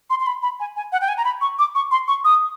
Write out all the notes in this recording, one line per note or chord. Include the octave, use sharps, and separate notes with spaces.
C6
C6
B5
B5
G#5
G#5
F#5
G5
G#5
A#5
B5
C#6
D6
C#6
C6
C#6
D#6